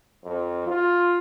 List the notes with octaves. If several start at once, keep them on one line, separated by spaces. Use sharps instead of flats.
F2
F4